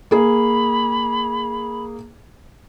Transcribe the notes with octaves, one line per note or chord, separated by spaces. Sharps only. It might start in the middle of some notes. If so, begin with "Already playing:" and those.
A#3 G#4 B5